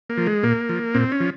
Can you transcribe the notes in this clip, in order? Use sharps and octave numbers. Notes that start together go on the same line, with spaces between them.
A#3
F3
G#3
A#2 A#3
F3
A#2 C4
C#4
F3